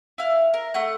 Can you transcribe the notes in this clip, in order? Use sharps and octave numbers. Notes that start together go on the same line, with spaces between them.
E4 F5
A#4
A3 F#5 F#6